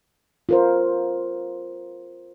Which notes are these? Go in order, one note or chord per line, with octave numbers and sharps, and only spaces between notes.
F4 A#4 C5